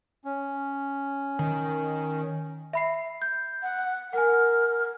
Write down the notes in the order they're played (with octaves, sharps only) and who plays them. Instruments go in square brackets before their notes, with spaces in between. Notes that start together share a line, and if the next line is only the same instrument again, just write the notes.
[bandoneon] C#4
[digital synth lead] D#3
[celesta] E5 B5 C7
G6
[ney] F#5
[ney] A#4 [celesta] F#5 G#5